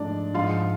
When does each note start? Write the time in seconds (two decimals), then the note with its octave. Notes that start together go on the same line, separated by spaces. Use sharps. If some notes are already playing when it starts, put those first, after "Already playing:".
Already playing: G#2 F3 A3 D4 D5
0.34 G#2 F3 G#3 F4 F5